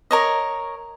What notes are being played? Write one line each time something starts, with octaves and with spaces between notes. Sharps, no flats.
A#4 C#5 D#5